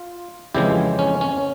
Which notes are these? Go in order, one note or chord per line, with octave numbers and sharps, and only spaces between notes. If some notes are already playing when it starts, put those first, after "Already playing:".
Already playing: F4
F2 C#3 E3 G#3 E4 G4
C#4
C#4